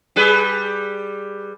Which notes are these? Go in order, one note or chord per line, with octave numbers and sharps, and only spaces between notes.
G3 G#4 B4